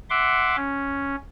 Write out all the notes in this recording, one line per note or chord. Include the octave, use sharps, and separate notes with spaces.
E5 F#5 C6 D6
C#4